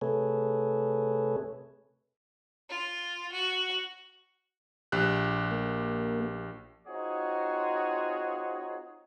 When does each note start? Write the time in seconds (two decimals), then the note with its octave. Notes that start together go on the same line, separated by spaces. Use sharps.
0.01 C3 A3 G#4 A4 B4 C#5
2.69 F4
3.32 F#4
4.92 A#1 G4 F#6
5.51 A#3
6.87 C4 D#4 F4 F#4 G#4 C#5